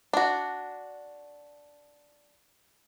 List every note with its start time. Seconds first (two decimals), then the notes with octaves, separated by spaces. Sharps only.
0.13 D4 F#4